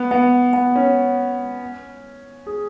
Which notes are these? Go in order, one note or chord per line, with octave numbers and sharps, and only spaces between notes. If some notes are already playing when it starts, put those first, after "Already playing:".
Already playing: B3
B3
B3
C#4
G#4